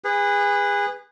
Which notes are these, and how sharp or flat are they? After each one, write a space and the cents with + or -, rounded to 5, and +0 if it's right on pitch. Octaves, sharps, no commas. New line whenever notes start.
G#4 -30 B4 +0